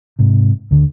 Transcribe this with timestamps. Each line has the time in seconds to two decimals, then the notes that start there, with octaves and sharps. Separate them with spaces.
0.19 G#2 C3
0.71 D2 D3